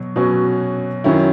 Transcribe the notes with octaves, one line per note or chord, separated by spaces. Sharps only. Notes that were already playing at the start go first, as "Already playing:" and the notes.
Already playing: B2 F#3
B2 F#3 C#4 F#4
F#2 D#3 F#3 C#4 E4